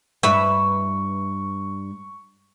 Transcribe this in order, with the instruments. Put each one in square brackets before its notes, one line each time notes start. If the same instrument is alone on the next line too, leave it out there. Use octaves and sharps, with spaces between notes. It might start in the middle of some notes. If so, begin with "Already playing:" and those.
[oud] G2 B4 E5 [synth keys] C#6